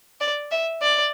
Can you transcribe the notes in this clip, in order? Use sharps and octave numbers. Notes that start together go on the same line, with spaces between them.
D5
E5
D5